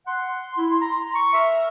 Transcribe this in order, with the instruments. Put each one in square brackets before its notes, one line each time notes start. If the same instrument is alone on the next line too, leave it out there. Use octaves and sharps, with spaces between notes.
[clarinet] F#5 [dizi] C6
[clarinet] E4
A#5
C#6
[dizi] A#4 [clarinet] E5